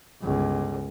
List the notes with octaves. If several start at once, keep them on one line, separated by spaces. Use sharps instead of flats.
G1 C#2